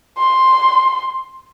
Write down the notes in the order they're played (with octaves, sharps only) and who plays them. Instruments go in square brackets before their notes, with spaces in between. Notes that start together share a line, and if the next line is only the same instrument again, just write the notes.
[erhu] C6